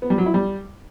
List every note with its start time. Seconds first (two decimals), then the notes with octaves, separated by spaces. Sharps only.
0.02 B3
0.10 G3
0.18 F#3
0.26 E4
0.34 G3